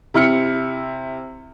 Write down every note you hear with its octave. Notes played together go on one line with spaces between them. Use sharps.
C3 E4 F6 C#7